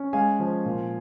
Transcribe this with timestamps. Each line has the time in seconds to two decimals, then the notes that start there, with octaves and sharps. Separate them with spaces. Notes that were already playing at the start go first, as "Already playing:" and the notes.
Already playing: C#4
0.13 G#3 F5 G#5
0.39 F3
0.65 A#2